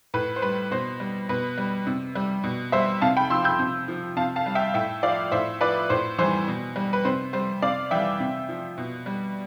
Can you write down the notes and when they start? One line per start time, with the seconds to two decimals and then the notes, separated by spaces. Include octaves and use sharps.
0.14 A2 B4
0.36 C5
0.42 G3 B4
0.71 B2 C5
1.00 G3
1.29 B2 B4
1.58 G3
1.87 C3
2.15 G3
2.44 B2
2.72 G3 C5 E5
3.02 C3 F5 A5
3.17 G5 B5
3.30 F3 C6 E6
3.44 E6 G6
3.59 C3
3.88 F3
4.17 C3 F5 A5
4.36 F5 A5
4.46 G3
4.55 E5 G5
4.74 A2 E5 G5
5.03 F3 D5 F5
5.31 A2 C5 E5
5.61 F3 B4 D5
5.90 A2 C5
6.18 E3 G3 C5
6.48 B2
6.76 G3
6.93 B4
7.05 C3 C5
7.33 G3 C5
7.62 C3 D5 F5
7.91 E3 G3 E5 G5
8.20 C3
8.49 F3
8.78 B2
9.06 G3